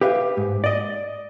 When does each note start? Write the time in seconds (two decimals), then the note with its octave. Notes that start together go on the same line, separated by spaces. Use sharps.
0.01 G4 B4 E5 F5
0.37 G#2
0.64 D5 D#5